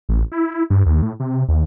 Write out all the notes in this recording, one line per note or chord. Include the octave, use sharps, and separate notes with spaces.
A1
E4
G2
D#2
A2
C3
D#2